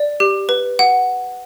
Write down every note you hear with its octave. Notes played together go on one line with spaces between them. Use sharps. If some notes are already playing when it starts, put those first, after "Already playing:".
Already playing: D5
G4
B4
F#5